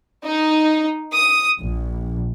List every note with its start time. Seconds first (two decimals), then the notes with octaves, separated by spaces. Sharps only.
0.25 D#4
1.13 D#6
1.59 A#1